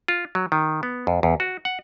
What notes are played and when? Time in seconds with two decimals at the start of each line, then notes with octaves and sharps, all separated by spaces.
0.08 F4
0.35 F#3
0.52 D#3
0.83 B3
1.07 F2
1.23 E2
1.40 F#4
1.65 F#5